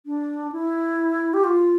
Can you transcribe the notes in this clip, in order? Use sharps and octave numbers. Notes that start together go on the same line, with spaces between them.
D4
E4
G4
F4